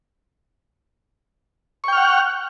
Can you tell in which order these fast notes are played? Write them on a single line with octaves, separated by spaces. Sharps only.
C#6 G5 F6 F#5